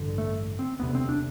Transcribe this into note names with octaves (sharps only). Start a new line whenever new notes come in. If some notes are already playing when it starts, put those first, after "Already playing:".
Already playing: A1 G2 D3
A3
C4
E1 D2 C3 B3
C4
D4